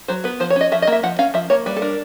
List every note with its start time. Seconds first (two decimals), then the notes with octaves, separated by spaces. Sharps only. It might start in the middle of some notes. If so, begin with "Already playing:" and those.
0.08 F#3 C5
0.24 B3 B4
0.40 F3 C5
0.50 C#5
0.56 C#4 D#5
0.72 F3 E5
0.82 D#5
0.87 A#3 E5
1.03 F3 F#5
1.19 C#4 F5
1.34 F3 E5
1.50 A#3 C#5
1.66 G3 B4
1.76 A4
1.82 D4 A#4